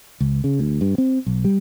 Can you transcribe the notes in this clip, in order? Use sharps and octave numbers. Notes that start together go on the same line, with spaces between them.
C#2
C#3
D2
G2
C4
B1
G3